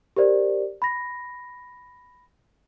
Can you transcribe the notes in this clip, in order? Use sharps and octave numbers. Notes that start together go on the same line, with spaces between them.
G4 A#4 C5 D5
B5 A#6